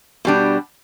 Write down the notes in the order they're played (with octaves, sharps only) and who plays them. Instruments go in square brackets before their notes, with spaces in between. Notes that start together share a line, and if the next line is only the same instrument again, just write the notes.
[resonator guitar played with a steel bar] B2 G3 D4